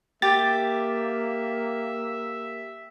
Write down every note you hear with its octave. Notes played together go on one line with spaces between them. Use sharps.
A#3 G4 E5 A6